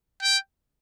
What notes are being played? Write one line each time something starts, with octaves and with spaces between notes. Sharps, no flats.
G5